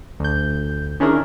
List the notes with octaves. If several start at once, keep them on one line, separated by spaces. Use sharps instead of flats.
D2 G6
D#3 C#4 D4 E4 G#4 A#4